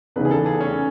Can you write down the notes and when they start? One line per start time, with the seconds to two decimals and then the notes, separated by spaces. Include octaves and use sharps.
0.16 E2 C#3 E3 B3 D#4 B4
0.25 G#4
0.31 A4
0.46 G#4
0.60 C#4